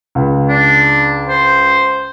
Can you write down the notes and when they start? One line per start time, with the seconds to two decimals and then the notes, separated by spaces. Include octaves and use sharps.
0.15 C#2
0.49 D4
1.29 C5